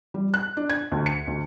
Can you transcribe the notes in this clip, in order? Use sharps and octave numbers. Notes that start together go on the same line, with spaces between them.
G3
F#6
D4
G#6
D2
C#7
D2